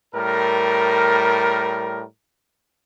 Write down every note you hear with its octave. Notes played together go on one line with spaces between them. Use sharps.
A2 G3 A#4